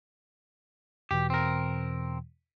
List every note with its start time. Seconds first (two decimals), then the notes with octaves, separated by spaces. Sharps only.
1.11 E2 B2 E3 G4
1.30 C4 A#4